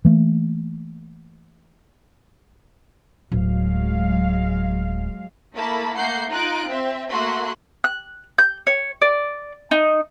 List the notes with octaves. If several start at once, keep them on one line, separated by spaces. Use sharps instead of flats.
E3 A3 A#3
D1 F#3 G#3 F5
A3 A#3 E4 A#4 A5 B5
A3 A#3 F#5 G6 C7
D#4 F4 F#6 D7
C4 E5
A3 A#3 F#4 E5 C6 F#6
F#6
G6
C#5
D5
D#4